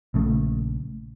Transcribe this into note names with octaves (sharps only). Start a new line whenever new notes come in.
A#1 C#3 A3